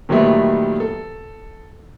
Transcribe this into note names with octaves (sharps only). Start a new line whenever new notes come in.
A#2 D#3 F#3 G3 A3 B3
A4